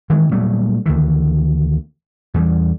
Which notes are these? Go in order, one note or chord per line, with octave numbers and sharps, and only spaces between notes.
D#3 E3 G#3
A#2 F#3 G3 A3
D2 D#3 E3
E2 E3 G3